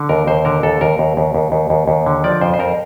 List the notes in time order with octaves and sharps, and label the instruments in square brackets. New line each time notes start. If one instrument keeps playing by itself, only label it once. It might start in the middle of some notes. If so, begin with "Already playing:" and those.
Already playing: [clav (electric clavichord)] D3
D#2 A#4
D#2 C5
D3 A#4
D#2 A4
D#2 A#4
D#2
D#2
D#2
D#2
D#2
D#2
D3
F3 D5
F2 C5
C5
F2 A#4